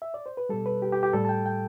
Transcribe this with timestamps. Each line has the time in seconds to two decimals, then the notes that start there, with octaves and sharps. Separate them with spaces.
0.02 E5
0.14 D5
0.26 C5
0.37 B4
0.49 B2 G3 A4
0.66 B4
0.82 G4
0.92 G4
1.03 G4
1.13 A2 G3 A4
1.25 A5
1.29 G5
1.46 G5